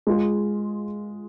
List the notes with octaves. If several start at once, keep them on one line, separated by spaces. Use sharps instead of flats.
G#3 F4 G#4